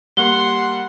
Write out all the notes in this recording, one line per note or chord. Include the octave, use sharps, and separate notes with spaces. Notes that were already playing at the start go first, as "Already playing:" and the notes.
G3 A#3 F#5 C6 G7